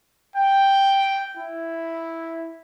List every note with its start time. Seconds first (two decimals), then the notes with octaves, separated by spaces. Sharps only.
0.36 G5
1.37 E4